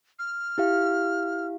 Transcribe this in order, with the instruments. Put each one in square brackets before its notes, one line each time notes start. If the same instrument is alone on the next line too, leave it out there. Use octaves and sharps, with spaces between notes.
[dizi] F6
[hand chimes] E4 G4 F5